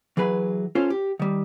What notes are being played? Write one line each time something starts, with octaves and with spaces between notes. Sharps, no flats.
E3 F#3 G#4 B4 B5
C#4 F4 A4 C5
G4
D#3 G3